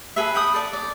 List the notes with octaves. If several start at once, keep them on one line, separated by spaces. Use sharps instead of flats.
G#4 A4 B4 E5
G5 B5 D#6
A4 D5
D5